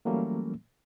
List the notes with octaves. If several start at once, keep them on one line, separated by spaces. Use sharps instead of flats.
E3 F#3 G3 A3 A#3 C#4